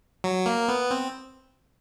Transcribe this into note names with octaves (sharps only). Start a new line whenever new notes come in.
F#3
A#3
B3
C4